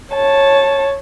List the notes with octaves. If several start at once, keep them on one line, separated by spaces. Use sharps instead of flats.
C#5 A5